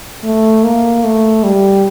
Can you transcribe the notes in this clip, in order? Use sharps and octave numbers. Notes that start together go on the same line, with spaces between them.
A3
A#3
A3
G3